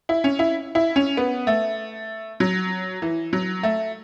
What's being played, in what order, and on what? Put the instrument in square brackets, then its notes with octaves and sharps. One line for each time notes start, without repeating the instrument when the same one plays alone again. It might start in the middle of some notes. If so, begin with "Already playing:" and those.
[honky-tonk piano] E4
C#4
E4
E4
C#4
B3
A3
F#3
E3
F#3
A3